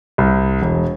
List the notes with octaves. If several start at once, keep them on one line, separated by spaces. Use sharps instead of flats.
C2
E1